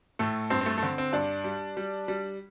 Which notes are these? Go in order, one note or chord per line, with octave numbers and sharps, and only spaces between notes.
A2 A3
G2 C4
C4
A3
A3
D3 C4
C4
G2 D4
G3
G3
G3